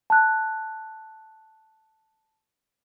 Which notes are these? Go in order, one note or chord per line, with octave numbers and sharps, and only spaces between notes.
A5 F#6